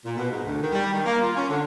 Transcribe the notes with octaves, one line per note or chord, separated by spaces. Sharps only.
A#2
B2
G#2
D2
D#3
G3
D#3
A#3
F4
C#4
D3